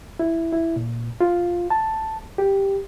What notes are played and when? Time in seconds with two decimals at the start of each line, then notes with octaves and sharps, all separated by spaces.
0.19 E4
0.53 E4
0.76 A#2
1.21 F4
1.70 A5
2.38 G4